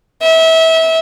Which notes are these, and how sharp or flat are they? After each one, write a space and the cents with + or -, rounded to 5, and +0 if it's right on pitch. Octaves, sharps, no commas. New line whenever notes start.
E5 -25